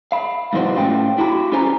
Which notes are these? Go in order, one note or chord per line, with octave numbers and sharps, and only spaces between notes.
F5 B5
G#2 C3 E3 F#3 F#4 C5
A2 C#4 F4 G4 G5
E4 F#4 G4 G5 A#5 B5
C#4 F4 G4 C5 G#5 A#5